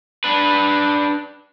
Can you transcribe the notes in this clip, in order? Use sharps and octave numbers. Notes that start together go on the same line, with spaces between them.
D4 B4